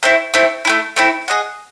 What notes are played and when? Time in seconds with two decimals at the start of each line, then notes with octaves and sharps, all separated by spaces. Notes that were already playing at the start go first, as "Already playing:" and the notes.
0.03 A3 C4 E4
0.34 A3 C4 E4
0.65 A3 C4 E4
0.96 A3 C4 E4
1.28 G#4 D#5 F#5